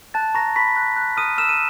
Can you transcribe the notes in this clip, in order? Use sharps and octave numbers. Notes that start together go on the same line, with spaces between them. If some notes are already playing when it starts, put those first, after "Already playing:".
A5 F#6 A6
A#5 C#6 A#6
B5 C#6 B6
F#6
F#6
D#6 F6 D#7
E6 F6 E7
D#7